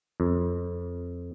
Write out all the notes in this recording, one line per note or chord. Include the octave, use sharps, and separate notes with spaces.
F2